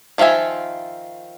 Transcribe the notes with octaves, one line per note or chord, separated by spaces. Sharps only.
D#3 F3 F4 E5 G#5